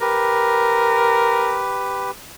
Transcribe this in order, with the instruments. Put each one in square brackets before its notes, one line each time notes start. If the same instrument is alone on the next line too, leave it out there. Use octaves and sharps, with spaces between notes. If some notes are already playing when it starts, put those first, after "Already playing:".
[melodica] G4 B4 [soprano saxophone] A#4